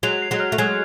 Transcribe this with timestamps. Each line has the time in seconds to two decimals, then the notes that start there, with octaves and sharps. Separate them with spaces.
0.03 F#3 G#3 F7
0.22 C7
0.31 F#3 G#3
0.40 F6
0.52 A3
0.58 F#3 G#3 G#6